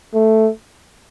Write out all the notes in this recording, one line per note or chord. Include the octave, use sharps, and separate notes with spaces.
A3